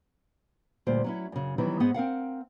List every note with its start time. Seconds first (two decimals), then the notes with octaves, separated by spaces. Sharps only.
0.87 D2 A#2 G3 F4 C5
1.04 F#3 C#4 E4
1.32 F#2 C#3
1.58 D#3 E3 F#3 G3 B3
1.80 G#2 B3 G#4 C5 D#5 F#5
1.94 C4 A#4 F5 F#5